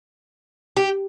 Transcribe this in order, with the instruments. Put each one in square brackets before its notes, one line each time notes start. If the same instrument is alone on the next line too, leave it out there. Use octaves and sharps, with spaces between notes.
[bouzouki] G4